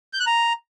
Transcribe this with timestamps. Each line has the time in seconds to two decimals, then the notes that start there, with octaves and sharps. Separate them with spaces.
0.13 G6
0.20 F#6
0.27 A#5